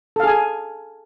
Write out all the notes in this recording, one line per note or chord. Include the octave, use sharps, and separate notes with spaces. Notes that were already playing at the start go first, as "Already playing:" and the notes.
G#4 A4 F5 G#5